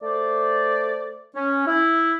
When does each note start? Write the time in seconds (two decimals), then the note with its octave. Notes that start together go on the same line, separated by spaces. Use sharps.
0.03 A3 C5 D5
1.35 C#4
1.67 E4